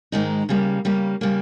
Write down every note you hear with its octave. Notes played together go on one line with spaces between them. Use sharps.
G#2 D#3 G#3 D#4
C#3 G3 A#3
C#3 G3 A#3
C#3 G3 A#3